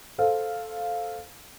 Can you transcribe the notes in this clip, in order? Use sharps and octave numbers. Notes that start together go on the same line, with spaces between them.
A4 C5 F5